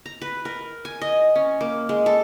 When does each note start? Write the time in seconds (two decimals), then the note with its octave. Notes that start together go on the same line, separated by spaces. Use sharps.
0.06 A#5
0.22 B4
0.45 A#4
0.85 G#5
1.01 D#5
1.36 C#4
1.61 A#3
1.89 G#3
2.06 A4